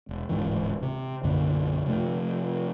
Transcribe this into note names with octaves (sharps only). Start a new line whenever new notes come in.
E1
D1 G#2 E3
C3
B1 F#2 D3 A#3
C3 F3 F#3 A3